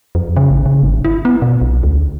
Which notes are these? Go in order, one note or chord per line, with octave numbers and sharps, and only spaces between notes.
F2
C#3
A1
C#3
G#1
E4
B3
B2
B1
D2